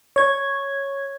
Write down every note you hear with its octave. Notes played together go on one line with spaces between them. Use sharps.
C#5 G#6